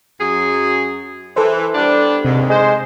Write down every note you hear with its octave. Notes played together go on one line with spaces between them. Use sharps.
F#2 F#3 G#4
E3 A4 C5
G3 B3 D4
D#2 G#2 C3
G#3 C5